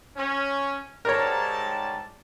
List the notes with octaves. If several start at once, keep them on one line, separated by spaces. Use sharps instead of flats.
C#4
G#2 G3 A#4 C#5 A5